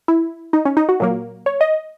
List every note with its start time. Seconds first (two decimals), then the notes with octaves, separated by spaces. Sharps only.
0.08 E4
0.53 D#4
0.65 C#4
0.77 D#4
0.89 F#4
1.00 A#2 F#3 A#3
1.46 C#5
1.61 D#5